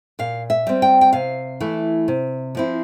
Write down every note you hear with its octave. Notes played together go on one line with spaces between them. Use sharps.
A#2 F5
E5
G3 C4
G5
G5
C3 F5
E3 A3 E4
C3
F3 C4 E4